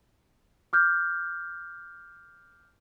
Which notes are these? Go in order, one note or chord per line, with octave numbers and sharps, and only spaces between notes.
D6 F6 G6